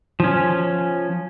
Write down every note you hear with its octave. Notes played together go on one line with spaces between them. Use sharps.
F3 C#4